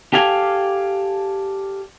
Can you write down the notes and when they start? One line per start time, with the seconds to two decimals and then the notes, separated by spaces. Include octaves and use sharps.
0.13 G4 A4 D5 F5 G#5